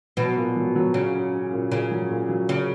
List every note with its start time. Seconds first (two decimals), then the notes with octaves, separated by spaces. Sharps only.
0.17 B2 F#3
0.37 A#2
0.56 F#3
0.75 F#3
0.94 C#3 C#4
1.13 C#4
1.33 C#4
1.52 A#2
1.71 A#2 C#3
1.91 F#3
2.10 A#2
2.29 F#3
2.49 A#2 C#3